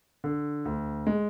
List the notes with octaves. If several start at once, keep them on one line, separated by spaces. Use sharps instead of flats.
D3
D2
G#3